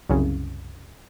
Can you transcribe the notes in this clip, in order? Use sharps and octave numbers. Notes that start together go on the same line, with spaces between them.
C2 F#2 C#3